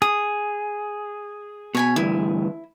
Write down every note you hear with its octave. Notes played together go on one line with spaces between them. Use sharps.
G#4 D#6
B2 C#5 G#5 B5
D2 G2 E3 E4